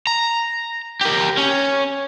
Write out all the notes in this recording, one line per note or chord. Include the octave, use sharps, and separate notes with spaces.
A#5
G4 A#4
C#4